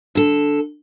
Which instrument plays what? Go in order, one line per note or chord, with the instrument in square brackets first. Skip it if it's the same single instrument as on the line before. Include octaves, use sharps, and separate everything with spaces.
[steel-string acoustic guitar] D3 A4